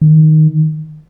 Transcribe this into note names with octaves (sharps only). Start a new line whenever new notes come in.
D#3